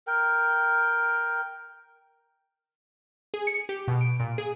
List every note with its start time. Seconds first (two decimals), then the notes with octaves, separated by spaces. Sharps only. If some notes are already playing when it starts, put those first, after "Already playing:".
0.07 A#4 G5
3.34 G#4
3.47 C#7
3.69 G4
3.88 B2
4.01 D7
4.20 A#2
4.38 G#4